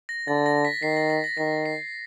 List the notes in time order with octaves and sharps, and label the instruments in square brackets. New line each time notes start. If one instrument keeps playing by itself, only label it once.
[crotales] A#6
[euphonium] D3 [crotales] A6
[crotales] A#6
B6
[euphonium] D#3 [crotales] C7
[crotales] A#6
A#6
A#6
[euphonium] D#3 [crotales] B6
[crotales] C7